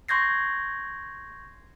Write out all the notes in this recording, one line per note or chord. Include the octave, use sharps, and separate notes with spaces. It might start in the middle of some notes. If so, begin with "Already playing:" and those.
C6 C#6 G6 G#6 A#6 C7